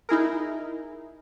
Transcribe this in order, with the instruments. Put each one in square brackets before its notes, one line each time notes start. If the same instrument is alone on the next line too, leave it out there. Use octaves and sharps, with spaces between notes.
[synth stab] D#4 E4 G#4 A#4